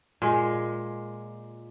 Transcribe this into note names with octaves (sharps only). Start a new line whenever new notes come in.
A#2 G#3